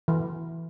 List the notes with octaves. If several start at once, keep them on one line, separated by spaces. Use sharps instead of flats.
E3